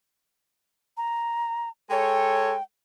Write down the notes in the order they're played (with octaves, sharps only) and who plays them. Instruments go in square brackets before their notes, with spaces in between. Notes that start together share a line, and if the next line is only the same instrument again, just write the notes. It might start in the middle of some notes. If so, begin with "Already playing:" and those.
[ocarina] A#5
[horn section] G#3 A4 C#5 [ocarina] G5